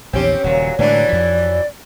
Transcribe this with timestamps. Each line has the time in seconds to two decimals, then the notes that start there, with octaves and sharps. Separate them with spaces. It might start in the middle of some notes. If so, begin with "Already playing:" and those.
0.13 A#1 E2 D#3 C4 C#4 G4
0.44 D#1 A#2 C#3 F#3
0.79 A2 D3 E3 F#3 G#3 D4 D5
1.09 F2 F3